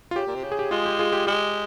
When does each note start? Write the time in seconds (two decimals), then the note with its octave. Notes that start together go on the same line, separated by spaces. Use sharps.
0.11 F4
0.16 C#3 G4
0.27 A#2
0.35 C3
0.43 C#3 G4
0.52 G#4
0.59 G4
0.71 G#3 F4
0.85 G4
0.99 F4 G#4
1.13 G4
1.27 G#3 G4